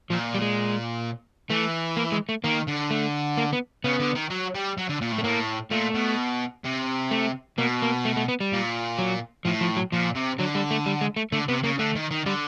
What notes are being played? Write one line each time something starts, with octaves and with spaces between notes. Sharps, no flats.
A#2 F3
G3
G#3
E3 A3
A#3
G#3
A3
D#3 A#3
D3
A3
A#3
B3
C#3 B3
D3
D#3
F#3
G3
F#3
D3
A#2
A2
A3
A2 A#3
A#2 A3
B2
C3
A3
B2 A#3
A#3
A3
A3
B3
G3
A#2
F#3
A2 F3
F3
F#3
A#2 F3
C3
D3 F#3
G3
A3
G3
G#3
A3
D3 A3
C3 B3
C#3 A#3
D3 A3
D#3
D#3
D3 G3